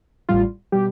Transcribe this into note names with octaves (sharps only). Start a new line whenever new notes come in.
A1 A2 G3 F4
B2 G3 G4